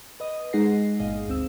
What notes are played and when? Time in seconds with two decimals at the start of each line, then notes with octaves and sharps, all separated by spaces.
0.20 B4 D#5 D#6
0.53 G#3 D#4 G#4 F#5 A#6 C7
1.00 G1 A#2 G#4 D#5 F5 D#6
1.28 D2 C4 E6